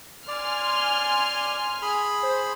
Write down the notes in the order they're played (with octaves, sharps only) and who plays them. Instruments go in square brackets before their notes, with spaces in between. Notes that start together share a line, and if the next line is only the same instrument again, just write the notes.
[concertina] D5 [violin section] G#5 C6 F6
[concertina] G#4 B5
[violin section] C5